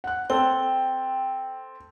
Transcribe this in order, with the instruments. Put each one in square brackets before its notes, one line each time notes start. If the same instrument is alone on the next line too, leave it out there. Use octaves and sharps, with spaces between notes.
[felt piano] F#5 F#6
[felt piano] C4 A4 [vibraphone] G5